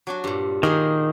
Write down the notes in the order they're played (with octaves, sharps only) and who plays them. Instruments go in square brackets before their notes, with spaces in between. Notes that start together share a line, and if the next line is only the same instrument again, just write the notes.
[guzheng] F#3 D4 F#4
G2 A#2
[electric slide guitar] D#3 [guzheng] A#3 G#4 C5